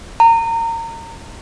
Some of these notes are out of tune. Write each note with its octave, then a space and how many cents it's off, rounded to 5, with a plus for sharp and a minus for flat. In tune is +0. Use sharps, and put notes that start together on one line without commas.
A#5 -30